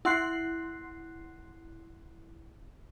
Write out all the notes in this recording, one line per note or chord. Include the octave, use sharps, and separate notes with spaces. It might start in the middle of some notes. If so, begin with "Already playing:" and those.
E4 F#5 C6 F#6 C7